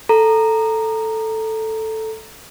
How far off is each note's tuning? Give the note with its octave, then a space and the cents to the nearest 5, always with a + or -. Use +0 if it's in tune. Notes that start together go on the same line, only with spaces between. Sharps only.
A4 +0 A#5 -5